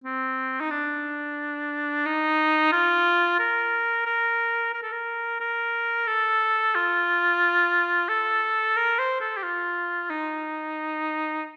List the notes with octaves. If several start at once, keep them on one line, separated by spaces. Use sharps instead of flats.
C4
D#4
D4
D#4
F4
A#4
A#4
A#4
A4
A#4
A#4
A4
F4
A4
A#4
C5
A4
G4
F4
D#4